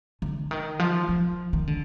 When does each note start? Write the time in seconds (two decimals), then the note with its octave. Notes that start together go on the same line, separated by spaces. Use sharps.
0.22 D3
0.51 D#3
0.79 F3
1.09 F3
1.53 D#3
1.67 D3